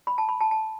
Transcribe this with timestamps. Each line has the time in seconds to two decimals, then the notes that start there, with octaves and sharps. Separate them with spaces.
0.07 B5
0.18 A5
0.29 B5
0.40 A5
0.51 A5